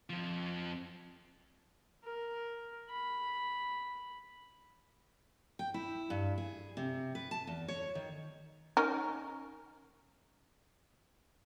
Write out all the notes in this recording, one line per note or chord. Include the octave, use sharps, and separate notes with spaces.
F2 F3
A#4
B5
G5
E4
G2
G#4
C3
B4
A5
E2
C#5
D#3
C#4 D#4 A#4